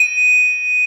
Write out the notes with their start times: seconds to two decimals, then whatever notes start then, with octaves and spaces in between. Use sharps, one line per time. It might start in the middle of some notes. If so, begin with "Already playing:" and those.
Already playing: D#7